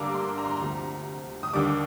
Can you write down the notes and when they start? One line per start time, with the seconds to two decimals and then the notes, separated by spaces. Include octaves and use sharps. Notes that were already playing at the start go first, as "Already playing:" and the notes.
Already playing: G2 D3 G3 A#3 A#5 D6
0.14 C6
0.38 A#5
0.45 C6
0.51 A#5
0.60 D2 C3 F3
1.43 D#6
1.53 D#2 D3 G3 D6